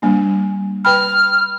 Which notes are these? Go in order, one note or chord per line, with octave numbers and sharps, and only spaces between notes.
G3 A#3 D4
B4 G5 B5 F6